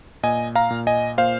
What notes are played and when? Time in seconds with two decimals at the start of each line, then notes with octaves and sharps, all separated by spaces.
0.23 A#2 D#5 G#5
0.55 F5 A#5
0.71 A#2
0.87 D#5 G#5
1.18 A#2 C5 F5